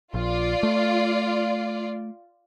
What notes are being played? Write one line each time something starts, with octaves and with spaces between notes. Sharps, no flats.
A#1 F4 D5
A3